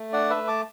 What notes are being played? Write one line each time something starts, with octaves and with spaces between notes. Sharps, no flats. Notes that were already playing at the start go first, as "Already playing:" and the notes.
Already playing: A3
D4 D5 F#5
B4 E5
A3
A5 D6